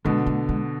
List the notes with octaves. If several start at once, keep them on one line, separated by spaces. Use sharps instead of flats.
B2 D3 G#3
A3
G#3